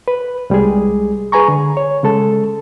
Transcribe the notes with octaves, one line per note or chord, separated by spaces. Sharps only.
B4
C2 G3 G#3 G#4
G#4 B4 G#5 A#5 C#6
D3
C#5
C#3 G#3 A4 A5